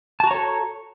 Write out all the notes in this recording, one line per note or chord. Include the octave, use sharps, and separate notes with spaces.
F#4 A4 C#5 A5 A#5